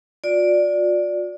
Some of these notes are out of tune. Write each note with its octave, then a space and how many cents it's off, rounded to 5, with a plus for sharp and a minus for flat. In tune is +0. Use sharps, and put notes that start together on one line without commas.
F4 +45 D5 +0